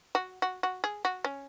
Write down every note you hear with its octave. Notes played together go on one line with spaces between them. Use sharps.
F#4
F#4
F#4
G#4
F#4
C#4